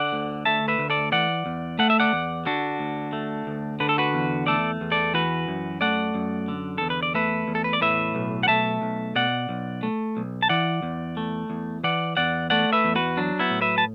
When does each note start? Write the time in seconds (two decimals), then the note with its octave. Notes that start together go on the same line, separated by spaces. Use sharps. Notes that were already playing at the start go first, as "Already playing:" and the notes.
Already playing: D3 D5 F#5
0.13 D2
0.45 A3 E5 A5
0.68 B4 E5
0.79 D2
0.90 A4 D5
1.12 E3 D5 F#5
1.46 E2
1.79 A3 F#5
1.90 E5
2.00 D5 F#5
2.13 E2
2.45 D3 D4 F#4
2.79 D2
3.13 A3
3.47 D2
3.80 D3 B4
3.89 A4
3.98 F#4 B4
4.14 E2
4.46 A3 A4 D5
4.81 E2
4.92 A4 D5
5.14 E3 F#4 B4
5.48 F#2
5.81 A3 D5 F#5
6.15 F#2
6.48 D3
6.78 E2 A4
6.90 B4
7.03 D5
7.15 A3 B4 E5
7.48 E2
7.55 A4
7.64 B4
7.73 D5
7.81 A2 B4 E5
8.15 B1
8.43 F#5
8.48 A3 E5 A5
8.82 B1
9.15 B2 D5 F#5
9.49 B1
9.83 A3
10.17 B1
10.42 A5
10.49 E3 D5 F#5
10.82 E2
11.17 A3
11.50 E2
11.84 E3 D5 F#5
12.17 E2 D5 F#5
12.50 A3 D5 F#5
12.73 B4 E5
12.85 E2
12.96 F#4 B4
13.17 F#3 D4
13.39 B3 E4
13.50 A2
13.62 B4 E5
13.78 A5